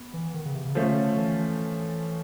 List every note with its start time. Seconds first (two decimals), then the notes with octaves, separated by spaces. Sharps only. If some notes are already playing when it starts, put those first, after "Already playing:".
Already playing: B3
0.14 E3
0.34 D#3
0.45 C#3
0.55 C3
0.65 C#3
0.75 D3 F3 A3 C#4
1.17 E3